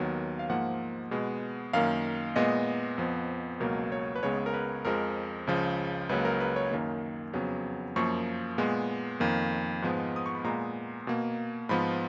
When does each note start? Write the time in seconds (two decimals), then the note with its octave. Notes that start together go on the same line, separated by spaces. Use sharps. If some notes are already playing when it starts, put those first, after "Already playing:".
Already playing: D#2 D#3 F#3 B3
0.39 F5
0.49 G#2 F3 A#3 F#5
1.11 B2 G#3 B3
1.73 F#2 D#3 A#3 F5
2.36 A#2 G#3 B3 D#5
2.98 F2 F3 B3
3.60 C#2 B2 F#3 A#3 A#4
3.92 C#5
4.16 B4
4.22 C#2 C#3 G#3 B3 C#5
4.46 A#4
4.54 B4
4.85 F2 F3 G#3 A#4
5.47 C#2 C#3 F3
6.09 C#2 C#3 F#3 A#3 B4
6.25 A#4
6.40 B4
6.56 C#5
6.71 F#2 D#3 A#3
7.33 F2 C#3 F#3 B3
7.96 F#2 F3 A#3 C#6
8.58 A#2 G#3 B3
9.20 F2 D#3 A#3
9.82 G#2 F3 G#3 B3
10.16 D#6
10.26 C#6
10.35 B5
10.44 A#2 G#3 B3 A#5
11.07 B2 A#3
11.69 G#2 F3 B3 B5